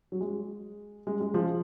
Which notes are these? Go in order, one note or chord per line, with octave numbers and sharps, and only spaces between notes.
F#3
G#3
G#3
G#3
F3